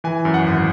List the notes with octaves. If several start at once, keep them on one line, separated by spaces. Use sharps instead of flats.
E3 G#5
F#2
F#5
G#1